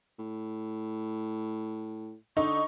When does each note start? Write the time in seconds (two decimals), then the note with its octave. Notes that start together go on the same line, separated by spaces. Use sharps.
0.19 A2
2.37 D3 D#4 C#6